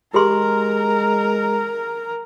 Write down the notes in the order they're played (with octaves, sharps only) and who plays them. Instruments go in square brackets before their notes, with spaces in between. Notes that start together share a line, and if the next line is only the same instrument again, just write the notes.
[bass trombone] G#3 [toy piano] G4 G#4 C6 [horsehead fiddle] A#4 A#5